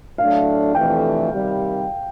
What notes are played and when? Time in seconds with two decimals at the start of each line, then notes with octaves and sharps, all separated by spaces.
0.18 A2 F#3 A3 D4 F5
0.74 F2 C3 E3 A3 D4 G5
1.30 C3 D#3 G3